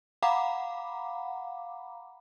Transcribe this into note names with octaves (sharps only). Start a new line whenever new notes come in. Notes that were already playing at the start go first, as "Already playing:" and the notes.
F5 F#5 A#5 B5 D6